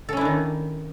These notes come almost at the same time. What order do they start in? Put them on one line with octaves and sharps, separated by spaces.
A4 C#4 E4 D4 D#3